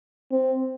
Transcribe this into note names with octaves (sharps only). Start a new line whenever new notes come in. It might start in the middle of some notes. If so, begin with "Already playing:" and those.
C4